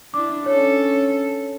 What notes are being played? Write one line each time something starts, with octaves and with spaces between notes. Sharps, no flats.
D4 E4 D6
C#4 A4 C#5